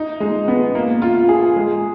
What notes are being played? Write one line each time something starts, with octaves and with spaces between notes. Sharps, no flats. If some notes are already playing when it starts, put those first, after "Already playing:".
Already playing: D#4
G#3
B3
A#3
F4
G#4
G#3